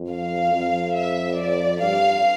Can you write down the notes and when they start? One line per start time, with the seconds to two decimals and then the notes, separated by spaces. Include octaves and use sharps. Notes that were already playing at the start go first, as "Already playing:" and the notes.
Already playing: F2
0.10 F5
0.53 F2
0.95 E5
1.37 D5
1.80 G2 F5